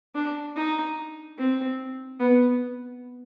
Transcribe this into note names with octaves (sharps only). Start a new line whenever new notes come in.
D4
D#4
C4
B3